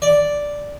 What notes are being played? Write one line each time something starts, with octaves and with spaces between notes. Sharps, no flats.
D5